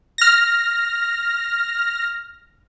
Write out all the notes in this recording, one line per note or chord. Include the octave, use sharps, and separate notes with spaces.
F6 A#6